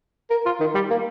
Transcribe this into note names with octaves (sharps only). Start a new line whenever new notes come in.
A#4
F4
D#3
G3
A#3